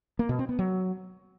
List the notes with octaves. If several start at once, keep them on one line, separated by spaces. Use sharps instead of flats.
A#3
B2
C4
B3
F#3